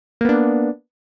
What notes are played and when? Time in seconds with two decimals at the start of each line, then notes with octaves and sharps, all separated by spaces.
0.21 A#3
0.25 B3
0.29 D4